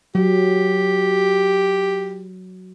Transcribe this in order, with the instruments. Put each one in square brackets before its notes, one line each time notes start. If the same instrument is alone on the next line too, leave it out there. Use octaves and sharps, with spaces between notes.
[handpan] F#3 [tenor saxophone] G4